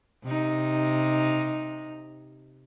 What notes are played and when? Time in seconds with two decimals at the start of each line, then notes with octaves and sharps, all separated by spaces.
0.24 C3 D#4